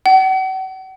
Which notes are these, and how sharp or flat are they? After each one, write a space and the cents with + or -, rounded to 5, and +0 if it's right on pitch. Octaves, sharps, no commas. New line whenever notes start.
F#5 +40